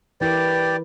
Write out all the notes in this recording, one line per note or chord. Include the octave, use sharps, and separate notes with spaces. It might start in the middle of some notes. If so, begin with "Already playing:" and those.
E3 E4 G4 A#4 B4 D5